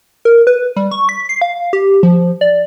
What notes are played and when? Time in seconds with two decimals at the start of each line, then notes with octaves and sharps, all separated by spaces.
0.25 A#4
0.47 B4
0.76 G3
0.91 C#6
1.09 B6
1.29 C7
1.42 F5
1.73 G4
2.03 F3
2.41 D5